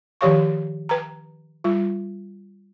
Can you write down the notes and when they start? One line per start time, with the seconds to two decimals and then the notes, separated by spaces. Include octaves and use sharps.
0.21 D#3 F3 G4 C#5 F5 C#6
0.89 B4 A#5
1.64 G3 F4